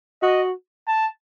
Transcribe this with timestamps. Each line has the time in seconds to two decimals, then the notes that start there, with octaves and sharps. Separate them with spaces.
0.22 F#4 D#5
0.87 A5